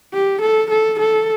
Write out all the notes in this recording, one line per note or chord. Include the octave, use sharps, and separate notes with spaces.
G4
A4
A4
A4